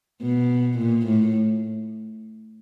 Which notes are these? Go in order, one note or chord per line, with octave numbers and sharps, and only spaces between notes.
B2
A#2
A2